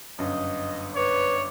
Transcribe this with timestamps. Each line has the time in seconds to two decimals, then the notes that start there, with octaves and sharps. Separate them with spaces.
0.19 G1 F#2 D#5
0.95 B4 C#5 D5